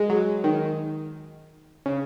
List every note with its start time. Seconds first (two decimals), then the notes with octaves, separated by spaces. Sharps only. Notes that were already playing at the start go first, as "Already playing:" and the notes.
Already playing: G#3
0.10 F#3
0.44 D#3
1.86 C#3